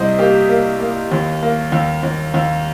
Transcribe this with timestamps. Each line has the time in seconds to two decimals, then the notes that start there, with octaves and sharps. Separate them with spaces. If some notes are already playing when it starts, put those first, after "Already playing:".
Already playing: C2 C3 C5 D#5
0.18 A#3 G4
0.49 A#3
0.80 A#3
1.12 D#2
1.43 A#3
1.72 D#2
2.03 D#2
2.34 D#2